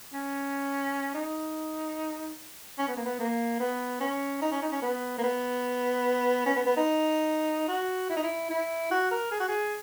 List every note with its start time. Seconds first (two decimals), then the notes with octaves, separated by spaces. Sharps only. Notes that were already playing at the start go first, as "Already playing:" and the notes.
0.13 C#4
1.14 D#4
2.79 C#4
2.88 B3
2.97 A#3
3.06 B3
3.19 A#3
3.60 B3
4.01 C#4
4.42 D#4
4.52 C#4
4.62 D#4
4.72 C#4
4.82 B3
5.18 A#3
5.24 B3
6.46 C#4
6.56 B3
6.66 B3
6.77 D#4
7.68 F#4
8.10 E4
8.17 D#4
8.24 E4
8.50 E4
8.91 F#4
9.11 A#4
9.32 G#4
9.40 F#4
9.48 G#4